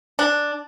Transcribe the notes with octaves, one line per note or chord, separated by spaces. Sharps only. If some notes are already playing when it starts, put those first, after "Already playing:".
D4